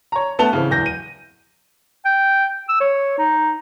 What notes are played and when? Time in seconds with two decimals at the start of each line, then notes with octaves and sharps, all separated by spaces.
0.12 C#5 A#5
0.39 A3 B3 A5 F7 G7
0.53 C#3 E3 C4
0.70 D1 E2 G6 A#6
0.86 D#7
2.05 G5
2.69 E6
2.80 C#5
3.18 D#4